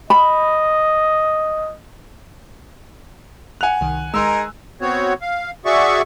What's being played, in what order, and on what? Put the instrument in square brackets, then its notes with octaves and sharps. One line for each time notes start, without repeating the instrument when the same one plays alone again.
[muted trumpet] D#5 [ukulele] B5
[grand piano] F#5 F7 [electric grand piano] G#5 F#6
[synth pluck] C2 D#3
[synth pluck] G#3 [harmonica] D#4 G#4 A#4 [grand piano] A#5 C6 E6
[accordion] B3 C4 F#4 C#5
F5
F#4 G#4 D5 E5 C#6